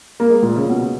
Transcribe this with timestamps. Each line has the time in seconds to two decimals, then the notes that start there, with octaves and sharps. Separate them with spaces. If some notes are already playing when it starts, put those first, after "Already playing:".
0.20 A#3
0.29 G#3
0.42 A#2
0.56 C#3
0.69 B2